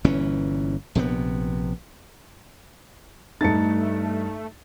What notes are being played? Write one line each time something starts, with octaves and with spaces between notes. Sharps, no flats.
G1 A#2 E3 C#4
A#1 C3 D#3 B3
G2 A3 D#4 A5 A6 C#7